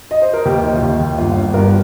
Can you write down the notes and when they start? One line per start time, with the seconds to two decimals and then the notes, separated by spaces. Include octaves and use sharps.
0.11 D#5
0.22 C5
0.34 A#4
0.45 D#2 G4
0.63 D#3
0.75 F4
0.82 D#2 G4
1.00 D#2
1.18 G1 F4
1.36 G1
1.54 G2 F4 A#4